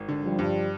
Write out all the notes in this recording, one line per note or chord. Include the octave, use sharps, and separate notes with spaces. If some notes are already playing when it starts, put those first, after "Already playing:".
Already playing: G#1
D3
F3 G3
G2